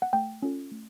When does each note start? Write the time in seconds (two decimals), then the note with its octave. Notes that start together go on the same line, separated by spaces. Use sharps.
0.02 F#5
0.13 A3 G5
0.42 C#4 F4 A4
0.72 A3